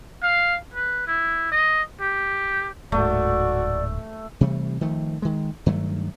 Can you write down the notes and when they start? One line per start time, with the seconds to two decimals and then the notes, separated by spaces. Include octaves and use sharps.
0.23 F5
0.74 B4
1.07 E4
1.52 D#5
2.01 G4
2.92 D1 G#2 A3 F#4 D5
4.41 C3 E3 G3 A3
4.81 D#3 F3 A3
5.22 D#3 G#3
5.66 G2 D#3 F#3 A3